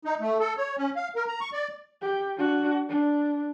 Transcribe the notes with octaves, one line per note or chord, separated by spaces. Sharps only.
D#4
A3
A4
C#5
C#4
F5
A#4
A#5
C#6
D5
G4
D4 F#4
D4